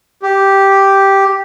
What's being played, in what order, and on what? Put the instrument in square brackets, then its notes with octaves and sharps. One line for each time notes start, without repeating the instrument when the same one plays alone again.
[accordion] G4